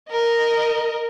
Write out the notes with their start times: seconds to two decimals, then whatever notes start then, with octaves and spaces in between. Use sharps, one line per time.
0.11 A#4 D#5